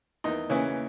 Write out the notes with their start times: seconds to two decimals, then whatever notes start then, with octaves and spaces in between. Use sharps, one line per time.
0.24 E2 D#3 D#4
0.50 C#3 E3 C#4